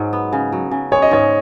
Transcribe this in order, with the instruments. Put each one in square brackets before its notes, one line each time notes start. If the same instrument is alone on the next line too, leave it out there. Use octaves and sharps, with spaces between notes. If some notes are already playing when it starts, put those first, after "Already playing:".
Already playing: [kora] G#2 F#3
B3
C#3
F#3
C#3
[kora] G#3 [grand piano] C#5
[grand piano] D#5
[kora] G#2 [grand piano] C#5